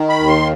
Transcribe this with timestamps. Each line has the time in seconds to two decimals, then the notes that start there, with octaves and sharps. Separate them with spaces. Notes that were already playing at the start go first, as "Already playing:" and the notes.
Already playing: D#3
0.09 B5
0.19 D#2
0.28 C6